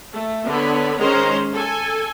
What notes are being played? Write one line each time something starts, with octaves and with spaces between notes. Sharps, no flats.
A3
D3 B3 C#5 B5
D#3 G#3 C#4 C5 A#5 C6
A4 G#5